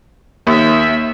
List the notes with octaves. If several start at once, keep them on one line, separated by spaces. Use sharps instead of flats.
D#2 A#3 E5